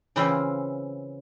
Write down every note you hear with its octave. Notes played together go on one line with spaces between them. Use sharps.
C#3 E3 C4 E4 F4 C5